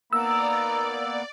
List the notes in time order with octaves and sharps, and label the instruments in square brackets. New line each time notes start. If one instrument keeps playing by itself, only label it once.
[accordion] A#3 B3 [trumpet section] D#4 A#5 [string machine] D5 [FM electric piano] E6